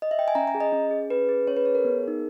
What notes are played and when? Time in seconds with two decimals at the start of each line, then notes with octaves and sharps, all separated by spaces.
0.02 D#5
0.11 E5
0.19 G5
0.28 G#5
0.35 C#4 A#5
0.47 A#5
0.55 G#4
0.61 D#5
0.72 C#4
0.91 G#4
1.10 C#4 B4
1.29 G#4
1.47 C#4 C#5
1.57 B4
1.65 G#4 C#5
1.75 A#4
1.85 B3
2.03 D#4 G#4